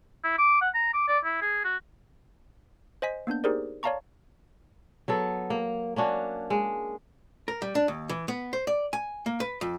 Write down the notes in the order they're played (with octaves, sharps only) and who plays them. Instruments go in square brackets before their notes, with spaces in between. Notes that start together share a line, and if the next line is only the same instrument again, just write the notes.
[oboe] E4
D6
F#5
A#5
D6
D5
E4
G#4
F#4
[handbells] C5 D#5 G#5 B6
A#3 B3 D4 G6
D#4 G4 G#4 A#4 C5 D5
C#5 D5 F5 A5 A#5 C#6
[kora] F#3 B3 A4
A#3
A#3 C#4 D4 F#4
G#3
[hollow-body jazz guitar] A#4
G3
D4
D#2
E3
B3
C5
D5
G#5
A#3
B4
F2